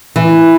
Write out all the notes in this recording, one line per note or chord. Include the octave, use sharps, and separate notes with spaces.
E3